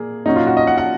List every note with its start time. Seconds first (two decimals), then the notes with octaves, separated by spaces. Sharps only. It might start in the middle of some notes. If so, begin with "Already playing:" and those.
Already playing: A#2 A#3 G#4
0.25 A#2 F#3 C#4 D#4
0.36 F4
0.47 F#4
0.57 D#5
0.67 F#5
0.78 F#5